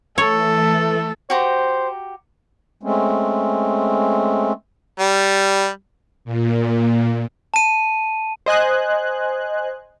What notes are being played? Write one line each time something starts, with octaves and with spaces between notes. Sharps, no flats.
E3 A3 A4 C#5
F#4 G4 C5 A#5
G#3 A3 C4 C#4
G3
A#2
A5 D#7
C5 D#5 G#5 F#6